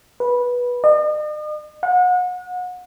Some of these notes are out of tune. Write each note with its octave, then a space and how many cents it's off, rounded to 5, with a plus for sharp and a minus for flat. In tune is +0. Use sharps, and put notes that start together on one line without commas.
B4 -15
D#5 -45
F#5 -35